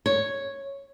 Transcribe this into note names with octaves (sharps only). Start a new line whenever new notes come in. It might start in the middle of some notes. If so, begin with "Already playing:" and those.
C#5